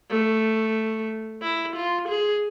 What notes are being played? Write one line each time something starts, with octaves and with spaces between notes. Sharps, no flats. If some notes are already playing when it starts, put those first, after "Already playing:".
A3
E4
F4
G#4